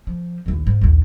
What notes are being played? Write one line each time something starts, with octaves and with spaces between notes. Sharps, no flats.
F3
A#1 D#2
G#2
A#1 D#2